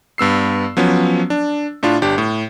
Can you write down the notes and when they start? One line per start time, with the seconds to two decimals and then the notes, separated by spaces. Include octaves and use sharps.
0.18 G2 B3 E6 C7
0.77 F3 F#3 B3 C#4
1.30 D4
1.83 A2 D4 F4
2.02 G1 D4 G4
2.18 A2